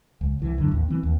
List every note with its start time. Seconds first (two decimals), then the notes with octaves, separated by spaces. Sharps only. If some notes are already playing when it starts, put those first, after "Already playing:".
0.21 C#2
0.39 C2 E3
0.58 F#2 D3
0.71 A1 D#2
0.89 E3 C4
1.03 D#2